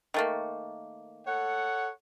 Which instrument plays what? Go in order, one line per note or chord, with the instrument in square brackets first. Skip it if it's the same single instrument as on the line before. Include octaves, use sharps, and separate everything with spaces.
[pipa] D#3 A3 A#3
[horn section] A4 C#5 F#5